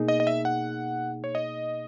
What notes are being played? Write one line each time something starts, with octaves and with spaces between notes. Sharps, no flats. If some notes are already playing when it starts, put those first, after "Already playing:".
Already playing: B2 A#3 D#4 G#4
D#5
D#5
E5
F#5
C#5
D#5